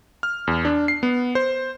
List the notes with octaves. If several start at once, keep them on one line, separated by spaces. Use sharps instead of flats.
F6
E2
D4
C7
B3
C5